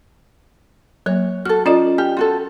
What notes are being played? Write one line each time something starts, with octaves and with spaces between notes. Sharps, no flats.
F#3 A#3 C#5
F#4 A4 F6
C#4 F4 D5 D#5
G4 F6
F4 F#4 A4